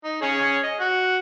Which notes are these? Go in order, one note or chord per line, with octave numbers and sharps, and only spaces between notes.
D#4
C#4 G#4 C#5
D#5
F#4